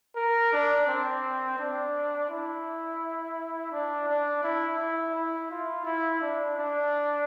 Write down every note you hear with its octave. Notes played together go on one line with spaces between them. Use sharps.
A#4
D4
C4
D4
E4
D4
D4
E4
E4
E4
F4
E4
D4
D4